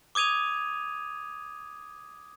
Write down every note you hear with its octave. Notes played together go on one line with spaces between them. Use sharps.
D6 D#6 G#6 D#7 F7